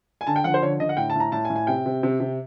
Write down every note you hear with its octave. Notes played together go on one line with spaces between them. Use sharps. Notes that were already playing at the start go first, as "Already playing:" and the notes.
G#5
D3 A5
G5
F3 F#5
C5
D3 C#5
D3 D#5
F#5
A2 G5
A5
A2 A#5
A2 A5
G#5
A2
G#5
C3 G5
C3
C3
C3